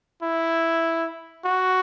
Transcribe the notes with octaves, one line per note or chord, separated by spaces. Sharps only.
E4
F#4